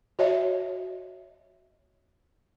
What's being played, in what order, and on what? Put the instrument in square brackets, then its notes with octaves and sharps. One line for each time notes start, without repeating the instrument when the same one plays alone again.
[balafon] F#4 C#5 D#5 E5